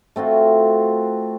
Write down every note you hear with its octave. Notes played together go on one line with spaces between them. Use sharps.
A3 C4 F4 F#4